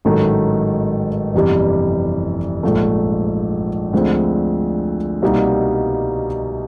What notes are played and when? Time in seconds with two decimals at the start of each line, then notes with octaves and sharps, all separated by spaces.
0.05 A1 G#2 D#3 F#3 A3
1.34 G1 F2 C3 E3 G3
2.63 A#1 G#2 F3 A3
3.93 D2 D3 F3 G#3 C4
5.22 C2 B2 G3 A#3 D#4